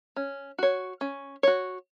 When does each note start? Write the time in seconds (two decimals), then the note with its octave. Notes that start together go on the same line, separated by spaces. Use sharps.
0.16 C#4
0.58 F#4 C#5
1.01 C#4
1.43 F#4 C#5